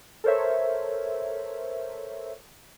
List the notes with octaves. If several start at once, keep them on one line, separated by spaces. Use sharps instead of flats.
A4 A#4 C5 C#5 E5